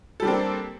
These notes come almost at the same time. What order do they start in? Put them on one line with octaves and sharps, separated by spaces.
A4 G3 D4 C4 A#3